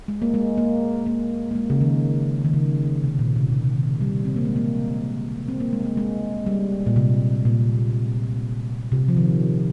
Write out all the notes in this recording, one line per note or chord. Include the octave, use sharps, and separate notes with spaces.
G#3
A#3
G#3
A#3
A#3
A#3
G#3
C#3
D#3
D#3
C#3
C3
A#2
C3
C3
C3
D#3
G3
C4
A#3
G#3
A#3
C4
A#3
G#3
A#3
G#3
G3
A#2
C3
A#2
C3
F3
D#3